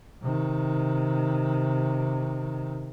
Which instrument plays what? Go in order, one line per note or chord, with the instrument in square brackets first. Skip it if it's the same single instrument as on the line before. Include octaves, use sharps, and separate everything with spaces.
[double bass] C3 D#3